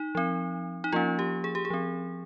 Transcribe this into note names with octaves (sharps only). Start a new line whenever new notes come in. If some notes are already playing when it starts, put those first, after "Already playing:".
Already playing: D#4
F3 C4
D#4
F3 A#3 C#4 F4
G4
G#4
G4
G#4
F3 C4